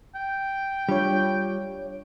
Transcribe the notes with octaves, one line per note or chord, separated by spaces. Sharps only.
G5
G3 D4 F4 C#5